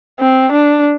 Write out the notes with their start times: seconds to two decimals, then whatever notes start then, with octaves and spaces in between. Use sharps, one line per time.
0.20 C4
0.52 D4